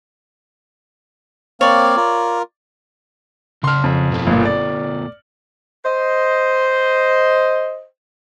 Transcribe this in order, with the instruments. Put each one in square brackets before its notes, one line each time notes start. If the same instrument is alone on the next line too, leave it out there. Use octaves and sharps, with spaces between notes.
[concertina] A#3 C4 F5 [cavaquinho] C#5 D5
[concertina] F4 A#4
[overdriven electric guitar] C#3 A5 [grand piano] C6 F6
[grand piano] F2
[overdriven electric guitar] B2 A3
[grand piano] G1 A#2
D5
[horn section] C5 D#5